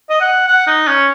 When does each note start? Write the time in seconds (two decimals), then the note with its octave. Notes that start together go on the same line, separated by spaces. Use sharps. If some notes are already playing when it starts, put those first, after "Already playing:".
0.10 D#5
0.21 F#5
0.48 F#5
0.67 D#4
0.87 C#4